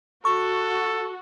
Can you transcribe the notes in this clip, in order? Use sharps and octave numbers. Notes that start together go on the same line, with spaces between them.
F#4 A4 C#6